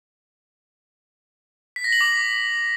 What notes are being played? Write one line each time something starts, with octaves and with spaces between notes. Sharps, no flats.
B6
A#6
F#7
D6